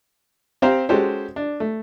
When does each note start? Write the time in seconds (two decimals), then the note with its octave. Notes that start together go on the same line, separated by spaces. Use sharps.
0.62 C4 G4 C5 F5 A#5
0.89 G#3 C#4 F#4 G4 A4 C5
1.36 D4
1.60 A3